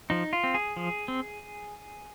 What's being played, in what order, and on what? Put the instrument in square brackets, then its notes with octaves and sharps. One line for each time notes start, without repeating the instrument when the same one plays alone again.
[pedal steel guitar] F3 D#4
F4
C4
G#4
F3
C4